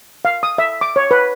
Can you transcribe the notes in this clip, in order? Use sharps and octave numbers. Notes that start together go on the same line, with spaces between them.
F5
D#6
E5
D6
C#5
B4